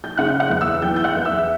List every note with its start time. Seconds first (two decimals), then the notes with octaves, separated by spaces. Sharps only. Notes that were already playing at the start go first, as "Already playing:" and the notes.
0.04 G6
0.17 C#3 F#5 F#6
0.40 F#5 F#6
0.50 E2
0.60 E5 E6
0.82 E3 G5 G6
0.96 G6
1.04 F#5 F#6
1.15 E2
1.25 E5 E6